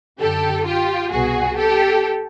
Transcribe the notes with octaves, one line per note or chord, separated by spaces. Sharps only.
F#2 D3 G4 A4
F4 G4
C2 B2 F#4 G#4
G4 A4